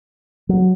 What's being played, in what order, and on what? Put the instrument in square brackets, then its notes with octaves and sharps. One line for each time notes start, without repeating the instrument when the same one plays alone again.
[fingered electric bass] F#3